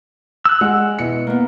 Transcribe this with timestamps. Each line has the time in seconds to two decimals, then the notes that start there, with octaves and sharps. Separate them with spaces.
0.45 E6 F#6
0.61 G#3 F#5
0.99 B2 E4 C#7
1.27 A#3 B3